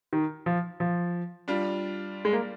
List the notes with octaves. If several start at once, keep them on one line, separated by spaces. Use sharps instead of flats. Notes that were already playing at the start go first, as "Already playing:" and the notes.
D#3
F3
F3
G3 D4 F4
G#3
A#3